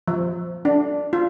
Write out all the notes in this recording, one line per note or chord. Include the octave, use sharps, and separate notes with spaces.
F3
D4
F4